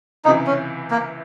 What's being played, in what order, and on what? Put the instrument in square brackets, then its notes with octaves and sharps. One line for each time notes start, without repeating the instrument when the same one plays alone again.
[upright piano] C#2 C3 E3 [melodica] D#4
[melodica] C#4
A#3